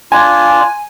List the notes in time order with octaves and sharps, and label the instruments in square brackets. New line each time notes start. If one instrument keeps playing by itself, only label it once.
[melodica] D4 F4 [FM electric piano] G#5